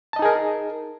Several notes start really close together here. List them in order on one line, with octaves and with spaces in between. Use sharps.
A5 D#5 D#4 G#4 A#4